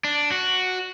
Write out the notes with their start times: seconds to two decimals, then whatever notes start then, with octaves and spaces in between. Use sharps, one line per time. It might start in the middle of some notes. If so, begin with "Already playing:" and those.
0.05 D4
0.32 F#4